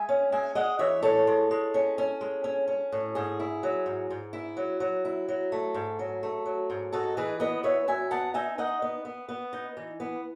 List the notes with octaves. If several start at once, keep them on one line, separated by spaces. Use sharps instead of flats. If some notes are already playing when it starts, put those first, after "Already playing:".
Already playing: G#3 E5 G#5
C#4
G#3 E5 G#5
G#3 D#5 F#5
E3 C#5 E5
A2 A4 C#5
G#3
G#3
C#4
C#4
G#3
C#4
C#4
A2
G#2 G#4
E4
F#3
G#2
G#2
E4
F#3
F#3
E4
F#3
A3
G#2
F#3
A3
F#3
G#2
D#4 F#4 A4
E3 G#4 B4
B3 B4 D#5
E3 C#5 E5
F#2 E5 G#5
B3 F#5 A5
D#4 E5 G#5
D#4 D#5 F#5
B3
B3
B3
D#4
E3
B3